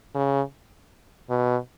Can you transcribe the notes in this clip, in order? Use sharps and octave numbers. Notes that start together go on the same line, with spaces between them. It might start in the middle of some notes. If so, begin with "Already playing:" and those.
C#3
B2